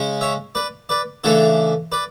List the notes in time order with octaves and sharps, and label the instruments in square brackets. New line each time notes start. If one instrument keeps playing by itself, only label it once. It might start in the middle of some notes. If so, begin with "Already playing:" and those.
Already playing: [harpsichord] C#3 G#3 C#4
C#5 E5
B4 D5
B4 D5
C#3 E3 A3 D4 A4 C#5
B4 D5